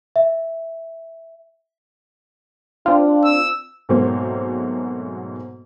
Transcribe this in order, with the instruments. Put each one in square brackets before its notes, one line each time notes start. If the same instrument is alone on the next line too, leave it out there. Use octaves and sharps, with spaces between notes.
[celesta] E5
[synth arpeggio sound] C4 F4 [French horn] D4
[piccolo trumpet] E6
[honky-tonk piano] G#2 B2 F#3 A3 A#3 C4